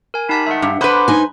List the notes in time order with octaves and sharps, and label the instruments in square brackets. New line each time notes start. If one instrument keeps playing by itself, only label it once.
[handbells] A#4 G#5
[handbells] D#4 A5 B6 [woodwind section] G4 F#5 B5
[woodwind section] D#3 G#3 A3 [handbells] E5 F#5
[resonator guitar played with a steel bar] G2
[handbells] D4 B5 F#6 [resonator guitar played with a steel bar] B4 C5 [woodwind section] F#5 D6
[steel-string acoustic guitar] D#4 G#5